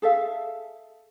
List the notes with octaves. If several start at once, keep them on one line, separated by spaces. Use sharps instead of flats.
G#4 A4 E5 F5